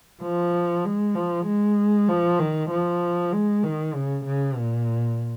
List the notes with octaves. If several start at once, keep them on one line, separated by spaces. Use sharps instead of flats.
F3
G#3
F3
G#3
F3
D#3
F3
G#3
D#3
C#3
C#3
A#2